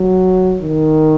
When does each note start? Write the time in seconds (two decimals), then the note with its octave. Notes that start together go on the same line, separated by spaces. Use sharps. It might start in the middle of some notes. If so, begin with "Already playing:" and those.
Already playing: F#3
0.62 D#3